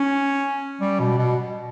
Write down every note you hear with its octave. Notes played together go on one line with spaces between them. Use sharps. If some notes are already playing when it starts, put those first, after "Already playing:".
Already playing: C#4
G3
B2
B2